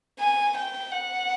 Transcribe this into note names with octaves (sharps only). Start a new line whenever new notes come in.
G#5
G5
F#5